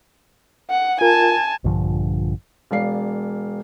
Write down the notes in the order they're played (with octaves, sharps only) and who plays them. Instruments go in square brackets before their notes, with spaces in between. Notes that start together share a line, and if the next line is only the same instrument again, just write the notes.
[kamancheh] F#5
[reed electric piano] F4 A#4 [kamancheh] G#5 A5
[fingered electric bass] A#1 G2 D3 F3
[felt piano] E1 D5 F5 C7